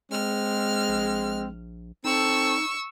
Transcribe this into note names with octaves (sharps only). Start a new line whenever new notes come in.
G#3 C4 F6
A#1
C4 D#4 A4 C#6 E6